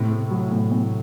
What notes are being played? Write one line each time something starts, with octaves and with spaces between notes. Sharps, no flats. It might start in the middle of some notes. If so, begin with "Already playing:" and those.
Already playing: A2 C3
A3
F#3
A2
A2